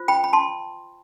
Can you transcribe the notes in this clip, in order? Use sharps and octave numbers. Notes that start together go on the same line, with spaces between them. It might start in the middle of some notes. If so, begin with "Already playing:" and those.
Already playing: F4 C5
G5 B5
B5
A5 C6